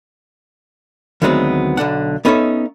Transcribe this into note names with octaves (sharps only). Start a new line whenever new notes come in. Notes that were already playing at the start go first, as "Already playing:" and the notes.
D2 D#3 F#3 G#3 B3 C4
B1 D3 D4 F#5
B3 C#4 D#4 A4 C#5 E5